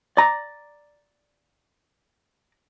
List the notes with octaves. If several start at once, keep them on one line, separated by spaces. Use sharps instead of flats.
D5 A#5